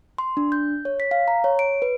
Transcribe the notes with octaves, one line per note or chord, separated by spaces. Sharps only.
C6
D4
G6
C#5
B6
F5
A#5
C#5
D7
B4